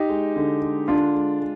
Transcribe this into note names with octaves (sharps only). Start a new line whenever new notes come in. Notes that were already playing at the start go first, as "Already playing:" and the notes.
Already playing: D#4 G4
G#3
D3
G#3
D3 D4 F4
G#3
G#3